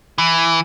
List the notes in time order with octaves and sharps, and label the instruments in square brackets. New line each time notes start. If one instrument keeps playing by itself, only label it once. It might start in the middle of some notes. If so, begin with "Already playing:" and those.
[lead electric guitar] E3